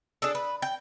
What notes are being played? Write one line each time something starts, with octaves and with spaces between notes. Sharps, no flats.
D4 G#4 A4
B4
G5